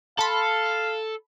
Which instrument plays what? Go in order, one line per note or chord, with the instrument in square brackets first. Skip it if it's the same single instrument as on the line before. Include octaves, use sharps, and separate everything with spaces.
[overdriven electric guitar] A4 [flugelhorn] F5 [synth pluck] A5 B5 C6